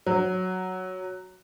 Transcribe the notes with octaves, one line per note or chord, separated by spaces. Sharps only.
F#3